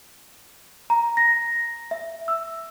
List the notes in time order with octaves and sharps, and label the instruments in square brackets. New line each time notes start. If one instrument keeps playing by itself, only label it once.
[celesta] A#5
A#6
E5
E6